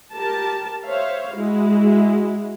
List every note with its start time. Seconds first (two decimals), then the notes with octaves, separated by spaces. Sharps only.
0.13 G4 A#4 A5
0.86 C5 C#5 E5 F5
1.36 G#3 E4 F#4